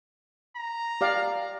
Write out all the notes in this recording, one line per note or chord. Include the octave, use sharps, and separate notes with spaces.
A#5
G4 D5 F5